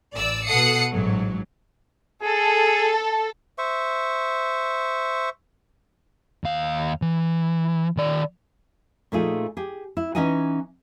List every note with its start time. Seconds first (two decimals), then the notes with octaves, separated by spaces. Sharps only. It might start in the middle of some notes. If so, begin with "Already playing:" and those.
0.15 A1 D5 E6
0.47 B2 A4 F#5 D#6 C7 C#7
0.91 A1 G#2 F#3
2.23 G#4 A4
3.58 C5 E5 C#6
6.44 D#2 F5
7.02 E3
7.97 D#3 D5
9.12 A#2 F3 A3 D#4 F4 G#4
9.57 G4 G#4
9.97 E4
10.15 E3 C#4 D#4 D#5 F#5 G#5